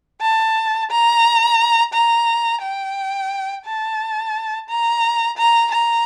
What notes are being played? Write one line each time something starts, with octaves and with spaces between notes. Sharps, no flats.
A5
A#5
A#5
G5
A5
A#5
A#5
A#5